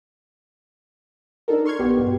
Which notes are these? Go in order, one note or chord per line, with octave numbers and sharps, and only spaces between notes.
D4 D#4 A4 A#4
C6 C#6 F6 G#6
A#1 B3 G4
G2 B2